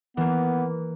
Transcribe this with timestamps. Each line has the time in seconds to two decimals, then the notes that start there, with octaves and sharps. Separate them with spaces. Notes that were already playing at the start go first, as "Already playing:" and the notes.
0.17 E3 A#3 B3